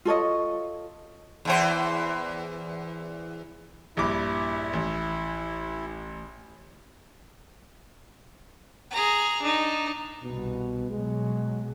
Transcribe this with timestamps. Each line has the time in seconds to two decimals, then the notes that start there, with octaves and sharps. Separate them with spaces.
0.05 F4 A4 C#5 D#5
1.45 E2 E3 C5
3.97 A#1 G2 E4 D6
4.73 A1
8.91 G#4 A#5
9.42 D4 D#4
10.23 C2 B2 B3
10.90 B2 F#3 G#3